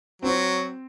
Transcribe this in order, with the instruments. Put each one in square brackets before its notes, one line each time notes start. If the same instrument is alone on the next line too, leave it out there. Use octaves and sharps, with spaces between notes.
[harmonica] F#3 [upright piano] C4